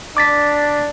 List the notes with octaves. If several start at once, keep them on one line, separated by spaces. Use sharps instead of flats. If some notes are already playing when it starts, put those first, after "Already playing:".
D4 D6 A6 B6